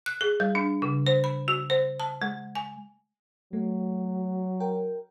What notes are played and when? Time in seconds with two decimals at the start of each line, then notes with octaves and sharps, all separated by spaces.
0.06 F#6
0.21 G#4
0.40 G3
0.55 D4
0.82 C#3
1.07 C5
1.24 B5
1.48 F#4
1.70 C5
2.00 A5
2.22 G#3
2.55 G#5
3.53 F#3 A3
4.60 A#4 G5